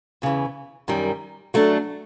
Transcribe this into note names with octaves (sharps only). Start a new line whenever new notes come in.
E2 C#3 E3
F#2 D#3 G3
F#3 A3 D4